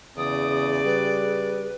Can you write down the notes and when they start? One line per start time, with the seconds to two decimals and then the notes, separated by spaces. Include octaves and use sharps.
0.17 E2 C#3 G#4 D5 D#6
0.85 G3 B4